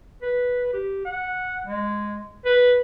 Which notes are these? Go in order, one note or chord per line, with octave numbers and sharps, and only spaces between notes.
B4
G4
F#5
G#3
B4